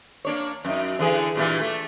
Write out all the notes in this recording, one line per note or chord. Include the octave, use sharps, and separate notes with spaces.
A#3 D4 C#5
F#2 D#4
D3 E3 G#4
G2 A#2 E3
A3